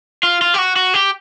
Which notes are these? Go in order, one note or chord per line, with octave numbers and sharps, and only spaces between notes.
F4
F4
G4
F#4
F#4
G4